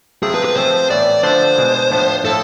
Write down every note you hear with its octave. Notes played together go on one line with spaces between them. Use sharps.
C3 F3 A3 C4 E4 G#4
B4
B4
F3 A3 C4 G#4 C5
A2 E3 B3 D5
D3 F3 A3 D4 C5
B2 G#3 D4
A2 F3 B3 D4
A2 F3 A3 E4 A4